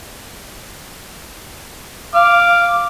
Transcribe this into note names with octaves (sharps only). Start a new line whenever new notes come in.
F5 D6